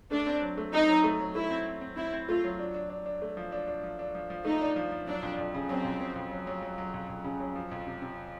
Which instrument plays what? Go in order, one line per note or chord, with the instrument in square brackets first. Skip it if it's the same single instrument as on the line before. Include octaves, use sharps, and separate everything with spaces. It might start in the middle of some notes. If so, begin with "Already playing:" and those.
[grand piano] A3 [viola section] D4
[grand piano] C4
F#3
A3
[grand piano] C4 [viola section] D#4
[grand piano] F#3
A3
F#3
[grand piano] A3 [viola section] E4
[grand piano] C4
C4
C4
[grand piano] C4 [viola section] E4
[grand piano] C4
[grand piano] A3 [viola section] F4
[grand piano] F#3
D4
D4
D4
D4
A3
F3
D4
D4
F3
D4
F3
F3
[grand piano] A3 [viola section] D#4
[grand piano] D4
F3
F3
[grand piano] F#3 [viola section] D4
[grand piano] F2
F2
C#3
[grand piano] F#3 [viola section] C4
[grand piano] F2
F#3
F2
F#3
F#3
F#3
F#3
F2
F2
C#3
F#3
F3
F2
C3
C3